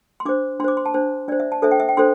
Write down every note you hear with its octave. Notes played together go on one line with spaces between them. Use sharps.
C6
D4 C5 D6
D4 C5 C6 D6
C6
A5
D4 C5
D4 C5 D5
E5
A5
D4 A4 C5 E5
G5
E5
G5
D4 A4 C5 C6